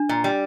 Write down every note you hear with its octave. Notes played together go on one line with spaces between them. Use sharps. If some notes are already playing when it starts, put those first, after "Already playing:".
Already playing: D4
A#2
G3